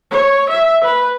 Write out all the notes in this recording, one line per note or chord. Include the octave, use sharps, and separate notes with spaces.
C#5
E5
B4